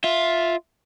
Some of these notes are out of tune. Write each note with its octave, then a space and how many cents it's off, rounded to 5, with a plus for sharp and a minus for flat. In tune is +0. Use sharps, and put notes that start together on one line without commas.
F4 +5 E5 +0